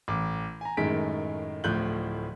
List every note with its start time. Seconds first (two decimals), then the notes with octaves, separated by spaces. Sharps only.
0.08 A1 D6
0.61 G#5 A#5
0.77 F#2 A2 D#3 G#3 B6 D7
1.64 D1 A2 F3 F#6 G6 F#7